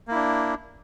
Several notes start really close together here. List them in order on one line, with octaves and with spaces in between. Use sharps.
A#3 E4 D4